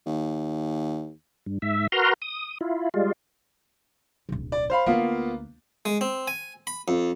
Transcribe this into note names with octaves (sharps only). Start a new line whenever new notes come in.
D#2
G2
G#2 E5
F#4 A#4 B4 A#5 C6
D#6
E4 F4
G3 G#3 F4
D1 B1
D5
C5 F5 B5
D2 A#3 B3 F4
G#3
C4
G#5
B5
F2